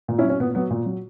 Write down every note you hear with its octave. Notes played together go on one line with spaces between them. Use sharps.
A#2
C#4 E4
F#3
C#4
A#2 B3
F#3 B3
A#2
F#3